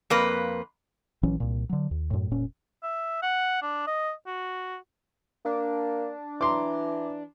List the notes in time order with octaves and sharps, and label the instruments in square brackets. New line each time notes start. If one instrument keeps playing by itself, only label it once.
[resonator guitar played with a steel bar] F2 A#3 B4
[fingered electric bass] A#1 E3 F#3 C#4
C2 A#2
D3 F#3
D#2
F#2 A2
F1 A#2 C#4
[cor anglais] E5
F#5
D4
D#5
F#4
[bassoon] A#3 [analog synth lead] D4
[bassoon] E3 [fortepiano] A#5 C6 D6